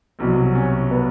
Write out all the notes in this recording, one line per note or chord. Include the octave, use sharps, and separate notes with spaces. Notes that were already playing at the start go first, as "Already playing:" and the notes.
C2 B2 F#3 C4
C#4
B3